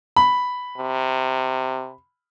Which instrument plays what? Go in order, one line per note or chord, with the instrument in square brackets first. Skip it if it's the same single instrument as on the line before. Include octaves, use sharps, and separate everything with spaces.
[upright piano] B5
[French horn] C3